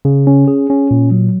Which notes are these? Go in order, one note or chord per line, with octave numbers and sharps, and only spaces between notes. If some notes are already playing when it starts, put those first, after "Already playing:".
C#3
C#4
G#4
C#4
A#2
F#3